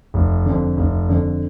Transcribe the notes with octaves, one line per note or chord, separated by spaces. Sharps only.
F1
F2 D3
F1
F2 D3